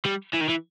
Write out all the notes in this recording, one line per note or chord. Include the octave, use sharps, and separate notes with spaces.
G3
E3
D#3
E3